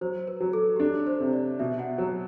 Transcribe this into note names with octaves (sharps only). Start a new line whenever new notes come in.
F#3 C5
B4
F#3
A4
G4
D4 A4
C5
C3
D5
B2 E5
F#5
F#3